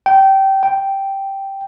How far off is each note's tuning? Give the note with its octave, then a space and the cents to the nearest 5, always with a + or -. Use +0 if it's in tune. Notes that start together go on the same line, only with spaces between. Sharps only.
G5 -20
G5 -5